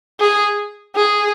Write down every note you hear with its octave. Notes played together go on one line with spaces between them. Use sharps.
G#4
G#4